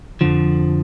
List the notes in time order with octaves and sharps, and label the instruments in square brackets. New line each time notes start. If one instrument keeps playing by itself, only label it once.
[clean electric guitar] F2 D3 F3